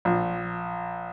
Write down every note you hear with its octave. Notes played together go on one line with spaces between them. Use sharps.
A#1